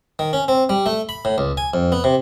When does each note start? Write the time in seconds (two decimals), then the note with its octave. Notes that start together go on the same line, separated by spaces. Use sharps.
0.19 D#3
0.33 C#4
0.48 C4
0.69 G3
0.86 A3
1.09 B5
1.25 A2
1.38 C#2
1.57 G#5
1.74 F2
1.92 B3
2.04 C3